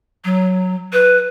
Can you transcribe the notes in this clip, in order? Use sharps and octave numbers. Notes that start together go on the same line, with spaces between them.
F#3
B4